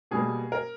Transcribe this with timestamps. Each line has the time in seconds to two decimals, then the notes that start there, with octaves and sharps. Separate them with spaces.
0.11 B2 G3 A#3 G#4
0.52 A#4